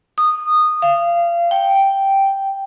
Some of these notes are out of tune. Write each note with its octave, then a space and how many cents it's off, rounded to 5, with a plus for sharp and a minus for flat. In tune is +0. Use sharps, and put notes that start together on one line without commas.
D#6 -15
F5 -25
G5 -5